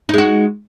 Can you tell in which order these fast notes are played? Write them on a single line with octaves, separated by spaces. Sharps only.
D#4 G#3 F#4